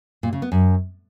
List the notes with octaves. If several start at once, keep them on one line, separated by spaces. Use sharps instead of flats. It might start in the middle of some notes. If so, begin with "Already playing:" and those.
A#2
C#3
B3
F#2